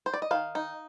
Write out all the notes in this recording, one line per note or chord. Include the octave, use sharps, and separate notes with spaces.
C5
D5
D#5
D#3 F5
D#4